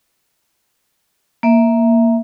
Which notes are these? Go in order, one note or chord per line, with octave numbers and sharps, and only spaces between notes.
A#3 E5